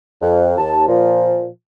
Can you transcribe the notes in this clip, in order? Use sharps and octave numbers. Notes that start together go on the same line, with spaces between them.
F2
D#2 A5
A#2 F3